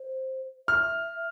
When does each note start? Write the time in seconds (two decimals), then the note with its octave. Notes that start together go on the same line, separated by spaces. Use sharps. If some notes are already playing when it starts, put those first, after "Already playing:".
Already playing: C5
0.68 E5 F6